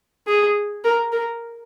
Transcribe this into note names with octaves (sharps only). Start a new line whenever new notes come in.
G#4
A#4
A#4